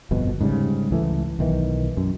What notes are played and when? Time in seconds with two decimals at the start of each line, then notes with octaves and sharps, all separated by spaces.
0.11 G1 F2 B2
0.41 G#2 C#3 G3
0.91 C#2 E3 A3
1.39 B1 D#3 E3
1.97 F#2